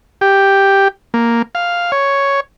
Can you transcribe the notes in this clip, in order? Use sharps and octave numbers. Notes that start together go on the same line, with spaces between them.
G4
A#3
F5
C#5